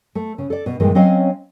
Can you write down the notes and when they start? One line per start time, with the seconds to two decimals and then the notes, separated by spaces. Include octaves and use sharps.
0.15 A3
0.38 C#3
0.50 A4 D5
0.66 B2
0.80 G2 A#2 D#3 E3 G#3
0.95 F#3 C4 C#4 C#5 D#5 F5